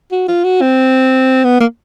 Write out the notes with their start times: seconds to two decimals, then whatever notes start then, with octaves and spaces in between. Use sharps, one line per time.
0.12 F#4
0.28 F4
0.44 F#4
0.61 C4
1.44 B3
1.61 A#3